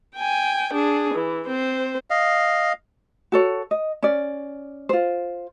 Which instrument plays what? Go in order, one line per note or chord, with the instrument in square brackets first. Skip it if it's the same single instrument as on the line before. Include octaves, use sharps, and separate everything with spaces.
[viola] G5 G#5
D4 G#4
E3
C4 C5
[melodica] D#5 F5
[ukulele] F#4 A4 C#5
D#5
C#4 D5
F4 C5